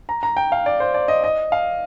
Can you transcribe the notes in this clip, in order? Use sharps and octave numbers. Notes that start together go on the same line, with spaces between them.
A#5
A#5
G5
F5
D5
C5
D5
D#5
D#5
F5